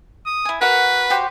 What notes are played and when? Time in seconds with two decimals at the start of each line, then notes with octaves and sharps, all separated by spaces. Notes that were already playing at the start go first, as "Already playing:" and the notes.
0.26 D#6
0.45 E4 G#5
0.61 F#4 A#4 B4 F#5
1.10 F#4 G4 C5